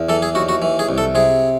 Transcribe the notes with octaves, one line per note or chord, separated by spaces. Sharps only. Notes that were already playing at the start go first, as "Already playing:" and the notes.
Already playing: E2
E3 A4
G#4
D#2 F#4
F#4
E3
G#4
C2
A4
C3 G#4